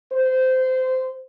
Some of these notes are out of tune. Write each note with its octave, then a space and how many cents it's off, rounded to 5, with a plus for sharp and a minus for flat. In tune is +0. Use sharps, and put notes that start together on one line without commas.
C5 -20